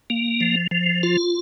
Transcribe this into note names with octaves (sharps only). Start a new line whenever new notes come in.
A#3
F3
F3
F4